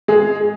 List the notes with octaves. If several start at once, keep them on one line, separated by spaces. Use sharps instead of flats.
G#3 G#4